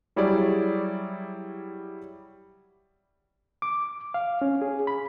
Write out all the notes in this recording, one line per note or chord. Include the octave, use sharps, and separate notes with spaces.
F#3 G3 E4 G#4 C#5 D5
D6
F5
C#4
G#4
B5